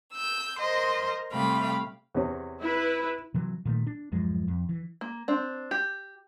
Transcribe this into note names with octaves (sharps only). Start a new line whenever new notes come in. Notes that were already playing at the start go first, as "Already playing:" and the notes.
E6 G6
A#4 C5 D#5 C6
C3 G3 A3 F5 G5 B5
E2 C3 C#4
E4 B4
C3 E3 F#3
A#2 D#3 A3
D4
D1 F#2 F3 G#3
F2
E3
A#3
C4 D4
G4